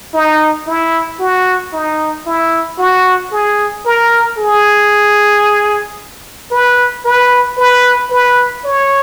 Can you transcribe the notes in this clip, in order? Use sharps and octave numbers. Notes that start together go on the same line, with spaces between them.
D#4
E4
F#4
D#4
E4
F#4
G#4
A#4
G#4
B4
B4
B4
B4
C#5